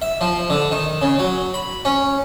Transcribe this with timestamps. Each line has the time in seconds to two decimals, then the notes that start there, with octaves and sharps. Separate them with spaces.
0.02 E5
0.21 F3
0.50 D3
0.72 D#3
1.02 C#3
1.19 F#3
1.54 B5
1.85 C#4